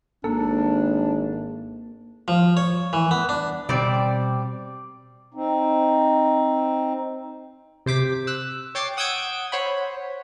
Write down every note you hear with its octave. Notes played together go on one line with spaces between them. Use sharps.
G#1 A#3 D4 A4
F3
C#5
E3
B3
D4
B2 G3 C4 D5
C4 D#4
C3 C5 D6 B6
E6 F#6
C#5 G5 D6 A6 C7
F#5 D#6 E6 G6 G#6 D7
C5 C#5 F#5 B5